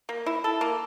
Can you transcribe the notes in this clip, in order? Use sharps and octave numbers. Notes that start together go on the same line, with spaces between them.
A#3
E4
A4
A#3